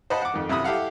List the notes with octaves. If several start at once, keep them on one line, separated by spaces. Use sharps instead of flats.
C5 D#5 F#5 A5 B5
F#5 D6
F2 D#3
F#2 C3 E4 B5 D#6
E4 G4 A4 F5 F#5